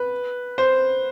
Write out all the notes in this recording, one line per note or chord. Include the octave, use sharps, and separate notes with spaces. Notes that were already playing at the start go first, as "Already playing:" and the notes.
Already playing: B4
C5